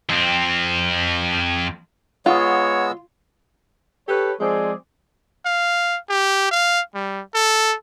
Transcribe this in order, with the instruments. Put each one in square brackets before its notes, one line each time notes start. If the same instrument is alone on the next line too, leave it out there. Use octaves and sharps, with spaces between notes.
[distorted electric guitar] F2 C4
[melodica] G#3 B3 E6 [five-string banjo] F4 [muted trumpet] C#5 [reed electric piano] F#5 C#6 D#6
[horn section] G4 A4 B4 C#5
F3 G#3 C4 G#4 D5
[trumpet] F5
G4
F5
G3
A4